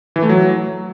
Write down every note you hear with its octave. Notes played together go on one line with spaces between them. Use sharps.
E3
A3
F#3